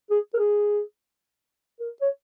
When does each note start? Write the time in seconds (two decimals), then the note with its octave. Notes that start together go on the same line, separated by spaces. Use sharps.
0.10 G#4
0.34 A#4
0.38 G#4
1.80 A#4
2.02 C#5